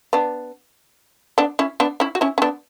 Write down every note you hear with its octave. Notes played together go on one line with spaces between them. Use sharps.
B3 D4
B3 D4
C#4 E4
B3 D4
C#4 E4
F#4
C#4 E4
C#4
B3 D4